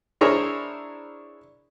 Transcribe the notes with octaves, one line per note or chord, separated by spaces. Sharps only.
D4 E4 G#4 A#4 C5 C#5